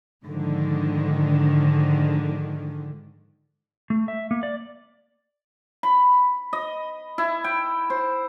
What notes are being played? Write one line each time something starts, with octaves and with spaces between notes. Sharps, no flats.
G#2 D3 D#3 F3
A3
E5
A#3
D5
B5
D#5
E4
G5
C5